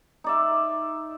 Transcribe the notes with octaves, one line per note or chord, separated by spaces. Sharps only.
D#4 D5 E5